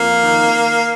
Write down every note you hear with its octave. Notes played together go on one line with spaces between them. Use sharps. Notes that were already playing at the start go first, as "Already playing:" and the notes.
Already playing: F2 A#3
D#3